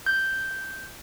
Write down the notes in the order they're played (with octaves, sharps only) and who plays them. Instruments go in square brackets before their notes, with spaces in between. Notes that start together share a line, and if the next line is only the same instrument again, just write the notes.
[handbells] G6